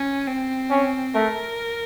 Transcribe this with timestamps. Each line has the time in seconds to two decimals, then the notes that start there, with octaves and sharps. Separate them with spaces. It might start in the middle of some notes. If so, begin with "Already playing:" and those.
Already playing: C#4
0.27 C4
0.70 C#4
1.14 A3 A#4